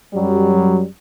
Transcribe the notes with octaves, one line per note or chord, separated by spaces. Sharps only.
F#2 F#3 G3